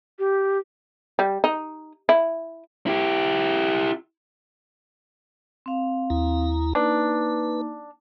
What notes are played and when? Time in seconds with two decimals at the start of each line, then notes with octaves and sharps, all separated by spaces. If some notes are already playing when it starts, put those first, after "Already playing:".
0.19 G4
1.19 G3
1.44 D#4
2.09 E4
2.87 E4 G4
5.66 C4 F5
6.10 D#2 E4 A#5
6.75 A#3 D4 D#4 B4